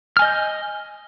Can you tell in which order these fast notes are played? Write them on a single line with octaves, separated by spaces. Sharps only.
F6 G#5 D#5 G6